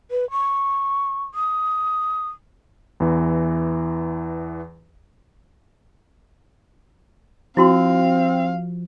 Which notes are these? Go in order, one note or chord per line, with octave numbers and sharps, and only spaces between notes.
B4
C#6
D#6
E2 E3
F3 C4 E4 F#4 F5 C6